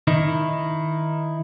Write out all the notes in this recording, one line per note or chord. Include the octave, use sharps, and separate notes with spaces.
D#3 D#4 E4